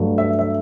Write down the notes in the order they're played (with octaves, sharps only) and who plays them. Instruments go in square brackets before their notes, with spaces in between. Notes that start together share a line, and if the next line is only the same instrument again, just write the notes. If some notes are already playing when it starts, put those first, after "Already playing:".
Already playing: [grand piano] G2 F#3 A3
E5
E5